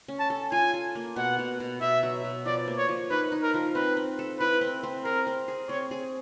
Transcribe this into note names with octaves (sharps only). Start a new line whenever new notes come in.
C#4
A5
A4
F4 G#5
A4
A#3
B2 F#5
B2
B2
B2 E5
F#3
B2
F3 D5
A#3
C#5
F3
D#4 B4
D#4
A#4
F3
C4 B4
C4
A4
E4 B4
C4
C4
G#4 A#4
C4
G#4
C4 C#5
G#4